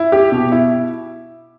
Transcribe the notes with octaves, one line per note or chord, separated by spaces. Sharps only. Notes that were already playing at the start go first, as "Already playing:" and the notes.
Already playing: E4
G4
B2
E4